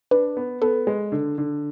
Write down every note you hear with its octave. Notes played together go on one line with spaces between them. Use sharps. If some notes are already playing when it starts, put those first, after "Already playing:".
D4 B4
B3
B3 A4
G#3
D3
D3